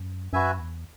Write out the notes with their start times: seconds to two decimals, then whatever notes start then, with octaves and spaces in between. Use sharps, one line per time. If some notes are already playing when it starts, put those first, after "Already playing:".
Already playing: F#2
0.33 F#2 F#4 B4 E5 G#5
0.59 E2